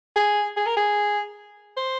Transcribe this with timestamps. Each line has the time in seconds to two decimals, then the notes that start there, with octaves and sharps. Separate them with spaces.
0.16 G#4
0.57 G#4
0.66 A#4
0.77 G#4
1.77 C5